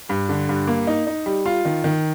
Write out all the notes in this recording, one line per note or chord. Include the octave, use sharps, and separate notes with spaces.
G2
D3
G2
A#3
D#4
D#4
G3
F4
D#3
D#3